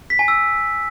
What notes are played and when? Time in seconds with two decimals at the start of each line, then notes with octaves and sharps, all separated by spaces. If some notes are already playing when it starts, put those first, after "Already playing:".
0.10 B6
0.19 G#5
0.28 E6